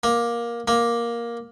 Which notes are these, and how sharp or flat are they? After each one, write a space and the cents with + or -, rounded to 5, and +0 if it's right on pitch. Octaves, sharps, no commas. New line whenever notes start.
A#3 +15
A#3 +10